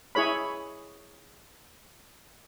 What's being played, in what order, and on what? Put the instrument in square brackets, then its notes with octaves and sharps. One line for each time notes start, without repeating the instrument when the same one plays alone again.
[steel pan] E4 G#4 C#5 B5